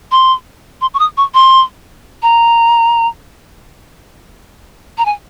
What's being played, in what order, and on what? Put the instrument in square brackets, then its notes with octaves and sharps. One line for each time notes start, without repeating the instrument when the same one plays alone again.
[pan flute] C6
C6
C#6
D#6
C#6
C6
A#5
A#5
G#5